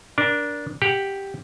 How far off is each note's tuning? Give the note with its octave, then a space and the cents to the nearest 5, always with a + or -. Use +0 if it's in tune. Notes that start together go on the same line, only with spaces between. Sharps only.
D4 -10 A#4 +25
G4 +0 F#5 +0